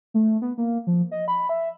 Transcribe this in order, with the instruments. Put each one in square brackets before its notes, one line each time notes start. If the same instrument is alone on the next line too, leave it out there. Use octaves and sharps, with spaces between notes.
[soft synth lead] A3
B3
A#3
F3
D#5
B5
E5